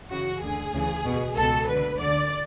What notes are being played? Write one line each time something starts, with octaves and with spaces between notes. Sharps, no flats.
F#2 C#3 E3 F#4
D2 D3 G#4
D2 C#3 E3
E2 B2
C#2 B2 A4
D2 D3 B4
D2 D3 D5